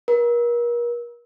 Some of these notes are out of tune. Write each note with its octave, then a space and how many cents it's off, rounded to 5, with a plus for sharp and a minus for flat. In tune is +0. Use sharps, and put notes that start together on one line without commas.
A#4 +35